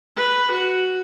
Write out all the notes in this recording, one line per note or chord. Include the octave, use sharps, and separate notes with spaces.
B4
F#4